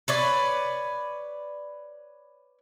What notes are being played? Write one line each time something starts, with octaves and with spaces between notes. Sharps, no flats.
B4 C#5 D5